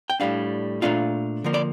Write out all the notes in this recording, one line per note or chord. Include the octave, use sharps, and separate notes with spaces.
G5
A2 G3 D4 F5
A#2 F3 A3 D4 F4 F5
D3 F3 A#3
D5